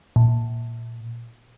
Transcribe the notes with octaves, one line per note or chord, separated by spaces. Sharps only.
A#2